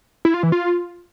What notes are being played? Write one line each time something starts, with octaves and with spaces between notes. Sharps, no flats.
E4
F4
E3
F4